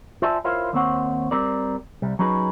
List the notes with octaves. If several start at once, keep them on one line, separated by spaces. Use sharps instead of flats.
F4 C5 D5 E5 G#5 A5
E4 F4 A#4 C5 C#5 F5
D#2 A#3 C4 C5 C#5 F#5
G3 C4 A#4 D5
C2 G3
F#3 C#4 D#4 G#4 B4